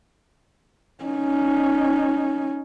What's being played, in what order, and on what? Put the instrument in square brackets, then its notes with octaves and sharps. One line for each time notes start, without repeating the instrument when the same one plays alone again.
[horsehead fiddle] C#4 D#4